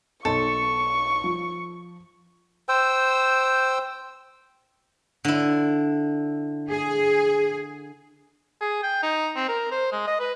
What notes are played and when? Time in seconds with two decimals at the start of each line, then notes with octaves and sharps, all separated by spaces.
0.25 B1 A4 D#5 C6 C#6
1.24 F3
2.69 C5 G5 E6
5.25 D3 E4
6.70 G#4
8.61 G#4
8.83 G5
9.03 D#4
9.36 C4
9.49 A#4
9.72 C5
9.92 G#3
10.07 D#5
10.20 B4